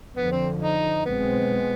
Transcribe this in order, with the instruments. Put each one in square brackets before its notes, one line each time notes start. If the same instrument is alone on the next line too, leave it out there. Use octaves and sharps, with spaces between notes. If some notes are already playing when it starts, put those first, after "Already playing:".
[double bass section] F2 D3 F3 [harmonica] B3
[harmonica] C4
D#4
[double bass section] B1 B2 G#3 C4 [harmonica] B3